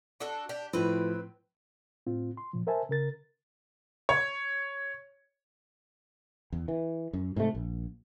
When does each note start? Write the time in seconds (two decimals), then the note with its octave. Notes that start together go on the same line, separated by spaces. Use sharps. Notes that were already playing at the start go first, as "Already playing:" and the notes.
0.20 D4 F#4 A4
0.49 D4 G4
0.73 A2 F3 C4 B4
2.07 A2 C4 F4
2.37 C6
2.53 A#2 F3
2.67 A#4 C5 E5 G#5 A5
2.89 C#3 A#4 A6
4.09 C#5
6.52 E2
6.68 E3
7.13 F#2
7.36 G#2 C3 E3 A3
7.55 A#1